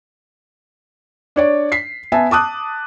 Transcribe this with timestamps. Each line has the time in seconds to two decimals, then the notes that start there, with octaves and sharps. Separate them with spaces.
1.36 D4 C#5 D5
1.72 B6 C7
2.12 B3 E5 G#5 A5
2.31 A5 D6 D#6 F#6